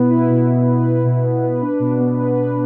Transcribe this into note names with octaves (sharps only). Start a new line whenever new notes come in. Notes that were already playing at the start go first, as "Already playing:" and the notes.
Already playing: B2 B3 E4 B4
E4
B2
B3
B4
E4
B2
B3
B4
D4
B2
B3
B4
D4